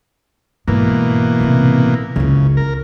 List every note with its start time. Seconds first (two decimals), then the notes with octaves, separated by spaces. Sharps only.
0.68 G#2 B2 E3 A#3
1.40 A2 C3
2.16 F#1 C#2 C#3
2.57 A#4